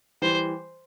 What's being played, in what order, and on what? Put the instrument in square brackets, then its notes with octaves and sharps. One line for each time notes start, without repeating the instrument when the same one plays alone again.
[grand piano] E3 G3 [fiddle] C5